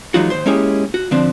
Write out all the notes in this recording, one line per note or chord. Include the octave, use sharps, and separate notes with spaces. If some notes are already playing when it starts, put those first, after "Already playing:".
E3 F#3 G#3 D#4 F4 F#4
D#2 B2 C5 C6
G#3 A#3 C#4 E4 G4 G#4
F#4
D3 F3 C4 D4